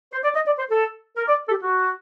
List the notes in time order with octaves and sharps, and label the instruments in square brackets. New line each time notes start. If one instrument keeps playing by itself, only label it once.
[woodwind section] C5
D5
D#5
D5
C5
A4
A#4
D5
A4
G4
F#4